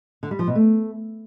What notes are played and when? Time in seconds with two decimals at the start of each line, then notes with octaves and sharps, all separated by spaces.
0.23 D3
0.31 G3
0.39 F3
0.47 B2
0.55 A3